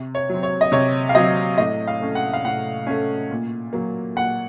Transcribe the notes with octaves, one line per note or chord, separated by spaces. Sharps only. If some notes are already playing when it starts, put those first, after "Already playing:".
Already playing: C3
C#5
F#3 C4
C#5
D#5
C3 C#5
F5
F#3 C4 D#5
A2 D#5
F5
A3 C#4
F#5
F5
A2 F#5
A3 C#4
A#2
F#3 A#3
A#2 F#5